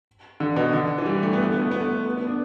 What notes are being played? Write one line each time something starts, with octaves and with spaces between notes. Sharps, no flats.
D3
B2
D3
E3
G3
A3
B3
A3
B3
A3
B3
A3
B3
B3
D4